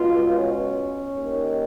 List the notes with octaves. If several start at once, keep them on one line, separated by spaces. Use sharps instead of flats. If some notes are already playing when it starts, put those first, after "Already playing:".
Already playing: C#2 B2 F4
C#4
D#2 D#3